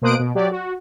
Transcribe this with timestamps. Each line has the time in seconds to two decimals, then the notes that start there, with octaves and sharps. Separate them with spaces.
0.02 B2 A#3 C5 D#6 F#6 D7
0.19 B2
0.35 F#3 G4 D5
0.51 F#4